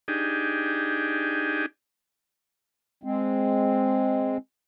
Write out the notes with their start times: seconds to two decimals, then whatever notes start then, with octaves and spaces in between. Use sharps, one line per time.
0.08 D4 D#4 G4 G#4
3.04 G#3 C4